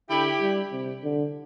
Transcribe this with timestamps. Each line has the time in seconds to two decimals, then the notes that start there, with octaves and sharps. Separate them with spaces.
0.10 D3 E4 G4
0.41 G3
0.72 C3
1.04 D3